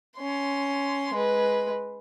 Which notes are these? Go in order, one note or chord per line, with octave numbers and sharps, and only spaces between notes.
C#4 C6
G#3 B4